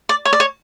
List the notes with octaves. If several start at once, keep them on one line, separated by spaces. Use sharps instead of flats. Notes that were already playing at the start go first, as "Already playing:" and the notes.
D5
C#5
D5
C#5